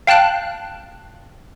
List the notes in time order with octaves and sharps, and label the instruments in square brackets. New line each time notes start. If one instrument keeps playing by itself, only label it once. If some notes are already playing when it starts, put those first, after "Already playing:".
[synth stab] F5 G5 A5 F#6